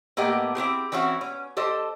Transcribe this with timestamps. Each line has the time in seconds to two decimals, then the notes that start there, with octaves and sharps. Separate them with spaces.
0.17 A2 A#3 B3 G4 D#5
0.55 C4 E4 G4 G#4
0.92 E3 C4 C#4 E4 F#4
1.21 C#4
1.57 G4 A4 C5 D#5